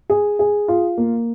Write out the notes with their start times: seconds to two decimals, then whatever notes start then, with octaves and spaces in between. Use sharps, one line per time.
0.10 G#4
0.39 G#4
0.68 F4
0.97 A#3